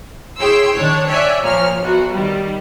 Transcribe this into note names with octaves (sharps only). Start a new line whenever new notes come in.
E4 G#4 C#5 G5 C6 E6
D#3 D4 C#5
C#5 D5 E5 G5 G#5 F#6
A#2 F3 C#5 F6
B1 F#4
D#3 G3